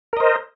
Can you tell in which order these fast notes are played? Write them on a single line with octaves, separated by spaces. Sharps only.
A#4 D#5 C5